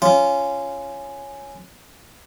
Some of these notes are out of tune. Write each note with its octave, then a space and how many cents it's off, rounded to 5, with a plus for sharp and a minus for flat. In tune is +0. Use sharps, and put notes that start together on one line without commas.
C#4 +0 F4 -20 D6 +20